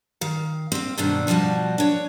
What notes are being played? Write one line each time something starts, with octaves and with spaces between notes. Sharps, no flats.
D#3 F5
C4 F5
G2 B2 D#3 C4 D4
B2 F3 G3 F#4 A5
D4 C#5